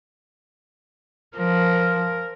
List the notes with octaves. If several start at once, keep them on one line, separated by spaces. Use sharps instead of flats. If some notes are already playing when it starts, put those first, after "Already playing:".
F3 A#4